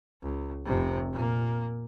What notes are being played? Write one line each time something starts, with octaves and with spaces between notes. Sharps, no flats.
C#2
F1 C3
A#2 A#3